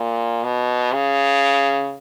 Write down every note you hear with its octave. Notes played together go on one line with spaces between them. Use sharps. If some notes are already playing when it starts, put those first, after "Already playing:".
Already playing: A#2
B2
C#3